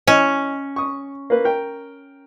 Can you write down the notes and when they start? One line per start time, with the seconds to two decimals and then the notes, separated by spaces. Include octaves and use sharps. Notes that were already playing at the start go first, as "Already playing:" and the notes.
0.07 E3 C#4 D#5
0.76 C#6 D#6
1.30 A#3 B4
1.45 A#4 G5